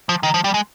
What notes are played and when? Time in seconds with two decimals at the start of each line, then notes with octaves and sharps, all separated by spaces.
0.09 F3
0.23 D#3
0.34 F3
0.44 G3
0.54 G#3